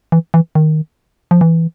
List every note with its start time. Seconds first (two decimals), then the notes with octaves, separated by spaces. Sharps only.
0.12 E3
0.34 E3
0.55 D#3
1.31 F3
1.41 E3